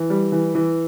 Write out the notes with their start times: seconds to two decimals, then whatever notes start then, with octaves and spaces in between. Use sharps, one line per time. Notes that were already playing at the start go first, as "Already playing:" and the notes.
Already playing: E3
0.10 G3
0.32 E3
0.55 E3